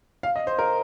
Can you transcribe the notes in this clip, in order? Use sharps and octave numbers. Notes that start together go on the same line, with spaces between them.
F5
D#5
C5
A#4